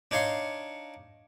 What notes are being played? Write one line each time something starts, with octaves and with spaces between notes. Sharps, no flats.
D4 D#4 C#5 F5 C6